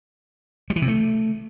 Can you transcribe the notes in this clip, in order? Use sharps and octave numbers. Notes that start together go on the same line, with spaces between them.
G3
E3
C3
A3